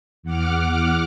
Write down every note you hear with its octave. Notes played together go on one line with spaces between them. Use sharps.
E2 F#5 D6 F6